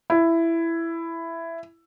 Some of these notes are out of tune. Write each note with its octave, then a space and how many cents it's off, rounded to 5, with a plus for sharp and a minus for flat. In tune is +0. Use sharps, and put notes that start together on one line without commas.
E4 +10